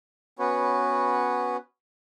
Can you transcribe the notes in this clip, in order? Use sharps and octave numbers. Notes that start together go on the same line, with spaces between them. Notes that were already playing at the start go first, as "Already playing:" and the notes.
B3 C#4 F#4 B4 C#5